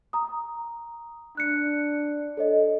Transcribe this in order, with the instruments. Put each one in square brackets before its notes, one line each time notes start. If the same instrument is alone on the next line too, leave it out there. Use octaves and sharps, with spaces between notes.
[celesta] A#5 D#6
[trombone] D4 [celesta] F#6 C#7
[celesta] A4 C#5 D#5